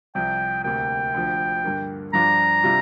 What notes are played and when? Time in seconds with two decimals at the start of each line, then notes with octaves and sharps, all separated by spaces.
0.15 C2 C3 F3 G5
0.64 D2 C3 A#3 G5
1.14 D2 D3 F3
1.64 G2 D3 A#3
2.13 G2 F3 D4 F4 A#5
2.64 C3 G3 D4 F4